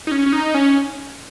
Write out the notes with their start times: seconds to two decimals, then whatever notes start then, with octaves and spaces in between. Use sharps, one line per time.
0.07 D#4
0.12 C#4
0.26 C#4
0.33 D#4
0.54 C#4